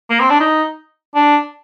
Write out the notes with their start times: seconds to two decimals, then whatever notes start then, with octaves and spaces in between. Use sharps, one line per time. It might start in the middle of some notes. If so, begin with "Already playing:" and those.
0.10 A#3
0.20 C4
0.30 D4
0.40 D#4
1.15 D4